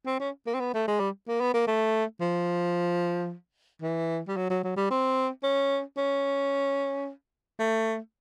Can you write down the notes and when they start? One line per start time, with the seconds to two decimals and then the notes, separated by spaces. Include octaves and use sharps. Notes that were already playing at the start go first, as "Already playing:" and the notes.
0.06 C4
0.20 C#4
0.47 A#3
0.54 C4
0.60 B3
0.74 A3
0.88 G#3
1.00 G3
1.28 A#3
1.41 B3
1.54 A#3
1.67 A3
2.21 F3
3.82 E3
4.28 G3
4.37 F#3
4.50 F#3
4.64 F#3
4.77 G3
4.91 C4
5.43 C#4
5.97 C#4
7.59 A3